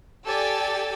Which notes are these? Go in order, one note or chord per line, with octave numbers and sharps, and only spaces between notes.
G4 A4 D5 G#5 E6 A6